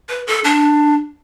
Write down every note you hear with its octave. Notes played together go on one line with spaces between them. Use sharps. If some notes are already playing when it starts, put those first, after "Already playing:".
B4
A4
D4